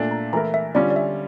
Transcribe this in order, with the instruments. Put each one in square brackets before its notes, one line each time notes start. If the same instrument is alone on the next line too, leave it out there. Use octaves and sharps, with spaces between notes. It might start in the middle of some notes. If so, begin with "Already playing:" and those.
Already playing: [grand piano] A#2 A3 D4
[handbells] A#5
[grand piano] E3 A3 E4 A#4 [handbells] A#5
[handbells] E5
[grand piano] D3 G3 C#4 F4 [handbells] D5
[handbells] D5
E5